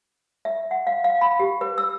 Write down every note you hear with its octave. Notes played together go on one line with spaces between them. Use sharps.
E5
F#5
F5
F5
B5
G4
B4
E6